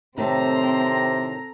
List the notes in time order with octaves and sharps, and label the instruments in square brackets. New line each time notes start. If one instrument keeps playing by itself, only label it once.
[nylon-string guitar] A2 D#3 A3 [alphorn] C3 [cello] C4 [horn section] A4 A#5